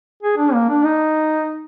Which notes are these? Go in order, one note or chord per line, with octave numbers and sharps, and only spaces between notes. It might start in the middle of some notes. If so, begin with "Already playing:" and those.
G#4
D4
A#3
D4
D#4